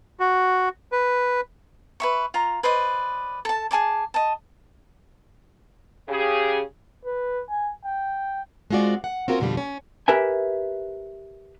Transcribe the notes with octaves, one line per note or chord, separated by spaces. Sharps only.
F#4
B4
B4 E5 C#6
F4 A#5
B4 C5 D5 D#5
A4 A5
G#4 G#5 A5 D6
D#5 A5
C#3 G4 G#4
B4
G#5
G5
G#3 C4 F4 F#4 D5
F#5
C4 C#4 F4 F#4 A#4
F2 B2 D3 G3 F4
C#4
G4 A#4 B4 E5 G#5